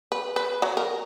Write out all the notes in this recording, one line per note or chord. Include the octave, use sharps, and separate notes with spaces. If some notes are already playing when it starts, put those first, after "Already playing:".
B4
B4
F#3
A#4